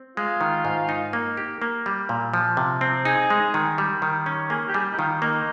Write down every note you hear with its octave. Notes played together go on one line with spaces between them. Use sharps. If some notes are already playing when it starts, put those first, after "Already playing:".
Already playing: C4
G#3 F4
D#3
G#2
D#4
A#3
G4
A#3
G3
A#2
F3
C3
C4
D#4 G#4
G#3
D#3
G3
D#3
C#4
A#3 G#4
G4
G3 G#4
D#4
D#3 F4
A#3 D#4